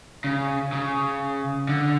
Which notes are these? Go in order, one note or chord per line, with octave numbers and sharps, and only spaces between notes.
C#3
C#3
D3